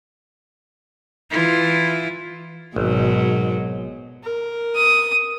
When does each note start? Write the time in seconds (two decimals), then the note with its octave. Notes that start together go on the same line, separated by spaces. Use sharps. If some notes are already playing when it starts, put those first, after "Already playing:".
1.30 E3 E4 F4
2.76 G#1 B2 F#3 G#3
4.23 A#4
4.76 D#6